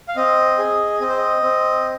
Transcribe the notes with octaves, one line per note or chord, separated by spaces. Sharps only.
F5
C4 D#5
G#4
C4 D#5
C5
D#5
C4